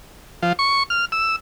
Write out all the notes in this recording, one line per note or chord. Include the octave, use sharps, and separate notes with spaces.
F3
C#6
F6
E6